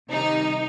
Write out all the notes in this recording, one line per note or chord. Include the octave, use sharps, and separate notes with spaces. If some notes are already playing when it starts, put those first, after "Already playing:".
C3 D#3 G3 D#4